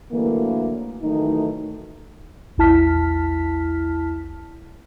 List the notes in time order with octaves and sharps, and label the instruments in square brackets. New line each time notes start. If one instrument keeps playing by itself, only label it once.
[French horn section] D3 E3 F#3 A3 A#3
D#3 E3 F#3 A3 D#4
[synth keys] A#1 E2 E4 A5 F6 B6